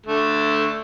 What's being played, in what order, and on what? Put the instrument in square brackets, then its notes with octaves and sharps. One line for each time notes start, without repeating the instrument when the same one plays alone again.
[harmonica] D3 A3